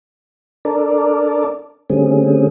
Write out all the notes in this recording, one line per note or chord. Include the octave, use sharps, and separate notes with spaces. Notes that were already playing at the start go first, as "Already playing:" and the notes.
D4 A4 A#4 D5
D3 G3 A3 C4 C#4 G#4